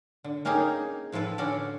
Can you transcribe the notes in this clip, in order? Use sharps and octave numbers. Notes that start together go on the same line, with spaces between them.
D3
A#3 C#4 D#4 G4 G#4
A2 F3 E4 A4 B4
D3 C#4 F#4 A4 D5